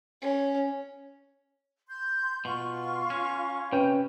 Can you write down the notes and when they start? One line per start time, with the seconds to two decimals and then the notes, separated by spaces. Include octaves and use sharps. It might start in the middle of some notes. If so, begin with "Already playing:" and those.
0.21 C#4
1.88 C6 G6
2.45 B2 F4 C#6
3.10 C#4
3.73 C3 C#4 B4 G5